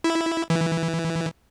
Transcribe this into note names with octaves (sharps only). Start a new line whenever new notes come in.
E4
E3